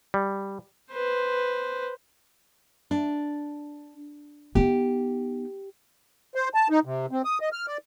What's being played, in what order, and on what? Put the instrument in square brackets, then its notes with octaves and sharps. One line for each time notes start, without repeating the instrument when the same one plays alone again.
[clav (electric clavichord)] G3
[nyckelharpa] B4 C5
[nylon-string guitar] D4
[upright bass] B3 D#4 [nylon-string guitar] G4
[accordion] C5
A5
D#4
C3
C4
D#6
D#5
F6
D5